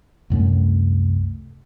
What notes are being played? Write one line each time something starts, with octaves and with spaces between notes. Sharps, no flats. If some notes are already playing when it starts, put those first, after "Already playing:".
C2 F#2 A3